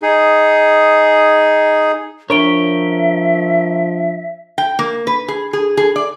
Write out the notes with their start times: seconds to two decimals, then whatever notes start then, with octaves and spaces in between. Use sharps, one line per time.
0.02 D#4 G#4
2.30 F3 D4 A#4 C#5 E5 D7 G7
4.58 G5
4.79 A#3
5.07 B4
5.28 G#4
5.53 G#4
5.77 G#4
5.96 D5